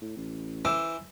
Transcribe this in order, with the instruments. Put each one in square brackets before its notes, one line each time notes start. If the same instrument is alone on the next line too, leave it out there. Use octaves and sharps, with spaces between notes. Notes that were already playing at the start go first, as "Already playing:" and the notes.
[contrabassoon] A2
A1
[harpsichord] E3 C5 D6 [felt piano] E6